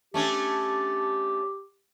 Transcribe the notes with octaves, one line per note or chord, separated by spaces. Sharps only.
A3 C#4 D4 G4